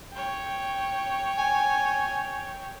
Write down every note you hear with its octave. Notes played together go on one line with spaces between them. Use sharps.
C#5 G5
G#5